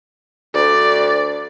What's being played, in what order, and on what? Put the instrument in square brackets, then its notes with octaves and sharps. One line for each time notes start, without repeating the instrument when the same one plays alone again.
[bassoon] D2 [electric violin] D5